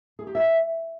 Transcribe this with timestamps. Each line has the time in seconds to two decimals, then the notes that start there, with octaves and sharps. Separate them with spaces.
0.19 G#4
0.27 G4
0.35 E5